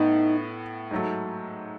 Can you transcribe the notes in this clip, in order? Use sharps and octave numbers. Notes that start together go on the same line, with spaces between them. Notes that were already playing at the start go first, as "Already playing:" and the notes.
Already playing: A2 B3 D#4
G#2 F#3 A3